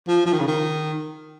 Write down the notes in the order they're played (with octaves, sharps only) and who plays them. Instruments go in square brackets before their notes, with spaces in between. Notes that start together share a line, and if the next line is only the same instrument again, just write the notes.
[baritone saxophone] F3
F3
D#3
C#3
D#3